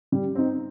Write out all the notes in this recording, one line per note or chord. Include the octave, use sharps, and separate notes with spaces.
G3
C4 D#4